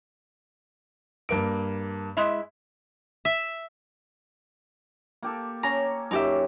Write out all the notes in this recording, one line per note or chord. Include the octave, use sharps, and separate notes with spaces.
G2 A#3 D7
G#3 E4 E5
E5
A#3 G4 A4
C#4 A#5
F#2 D#4 G4 E5